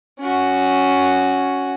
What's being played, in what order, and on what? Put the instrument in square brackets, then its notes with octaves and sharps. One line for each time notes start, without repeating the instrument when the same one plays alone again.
[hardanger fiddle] C#4 F#4